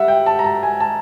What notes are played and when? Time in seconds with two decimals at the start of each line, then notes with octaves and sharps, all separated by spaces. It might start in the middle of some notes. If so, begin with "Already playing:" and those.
Already playing: G3 E5 F#5
0.08 G5
0.26 A5
0.39 A#5
0.44 A5
0.63 G#5
0.80 A5